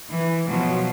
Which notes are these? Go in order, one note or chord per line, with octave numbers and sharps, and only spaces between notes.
E3
B2 F3 F#3